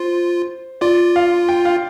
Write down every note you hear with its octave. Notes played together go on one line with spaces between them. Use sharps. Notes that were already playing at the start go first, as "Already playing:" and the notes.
Already playing: F4 C5
F4 D5
F5
G5
F5